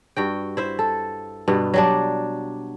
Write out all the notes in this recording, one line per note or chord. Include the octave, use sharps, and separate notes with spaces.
G2 F#4 G5
E4 C5 E5
A4
G2 B2 B3
F#3 G3 D4